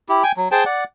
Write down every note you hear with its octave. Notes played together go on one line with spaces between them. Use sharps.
E4 G4
G5 G#5
F#3
G#4 C5 G5 A5
D5 F#5